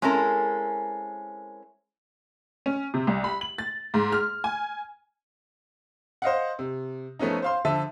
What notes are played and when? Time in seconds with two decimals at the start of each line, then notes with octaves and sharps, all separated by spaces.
0.02 G#3 C4 C#4 E4 A4 A#4
2.66 C#4
2.94 C3
3.07 C2
3.24 B5
3.41 F#7
3.58 A6
3.94 G#2
4.12 F6
4.44 G#5
6.22 C5 D#5 F5 F#5
6.59 C3
7.19 F3 A3 B3 C#4 D#4
7.42 C5 F5 C6
7.65 D3 F3 E5 A5